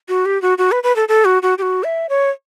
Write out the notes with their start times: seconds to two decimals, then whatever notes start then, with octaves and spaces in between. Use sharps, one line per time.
0.09 F#4
0.26 G4
0.42 F#4
0.58 F#4
0.72 B4
0.83 B4
0.96 A4
1.09 A4
1.25 F#4
1.43 F#4
1.58 G4
1.62 F#4
1.84 E5
2.09 C#5